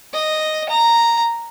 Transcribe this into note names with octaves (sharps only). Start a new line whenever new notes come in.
D#5
A#5